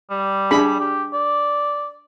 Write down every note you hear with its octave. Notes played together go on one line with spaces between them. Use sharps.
G3
D4 G#4 B5
G4
D5